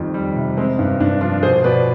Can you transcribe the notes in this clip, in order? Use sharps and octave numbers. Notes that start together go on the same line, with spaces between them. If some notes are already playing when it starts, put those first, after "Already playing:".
Already playing: F2 D#3 G3
G3
C3
G#3 C4
G2
G2 D4
F3 D4 F4
B2 G#4 C5
B2 B4 D5